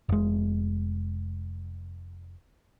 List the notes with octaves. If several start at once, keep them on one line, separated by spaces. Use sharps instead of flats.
F1 G#3